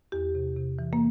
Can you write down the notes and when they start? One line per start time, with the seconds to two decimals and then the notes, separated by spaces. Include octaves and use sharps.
0.12 E2 G4
0.35 C3
0.56 C3
0.79 E3
0.93 A#3